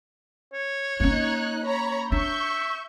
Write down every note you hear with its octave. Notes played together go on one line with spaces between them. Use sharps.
C#5
A#3 C#4 D#4 F#6
C#5 A#5 B5
D4 E5 C#6 G6